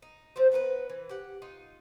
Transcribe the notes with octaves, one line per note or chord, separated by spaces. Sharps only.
D#4
F3 C4 C5
B3 D#4 G#4 B4
E3
G4 F#5
D#4 F4